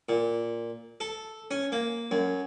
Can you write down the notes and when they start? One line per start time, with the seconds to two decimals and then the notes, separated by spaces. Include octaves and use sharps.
0.09 A#2
1.00 A4
1.51 C#4
1.72 A#3
2.11 F#2